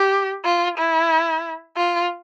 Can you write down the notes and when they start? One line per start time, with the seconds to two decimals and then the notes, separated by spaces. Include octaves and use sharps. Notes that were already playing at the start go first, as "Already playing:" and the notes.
Already playing: G4
0.45 F4
0.78 E4
1.77 F4